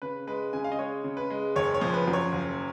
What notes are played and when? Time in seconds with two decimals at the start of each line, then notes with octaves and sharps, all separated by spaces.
0.02 C#3 B4
0.27 G#3 B4
0.53 C#3 G#5
0.64 F5
0.72 D#5
0.79 G#3 C#5
1.04 C#3
1.17 B4
1.30 G#3
1.56 F#1 C#5
1.74 C#5
1.81 F3
1.94 B4
2.08 F#2
2.13 C#5
2.32 F#1